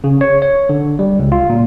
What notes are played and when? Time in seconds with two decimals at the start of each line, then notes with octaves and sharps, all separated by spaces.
0.04 C#3
0.21 C#5
0.42 C#5
0.69 D3
0.99 G3
1.19 C#2
1.32 F4
1.50 A#2